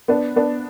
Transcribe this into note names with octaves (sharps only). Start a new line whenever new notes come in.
B3 D4
B3 D4